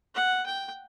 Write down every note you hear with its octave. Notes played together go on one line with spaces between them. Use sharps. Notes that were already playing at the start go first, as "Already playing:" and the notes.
F#5
G5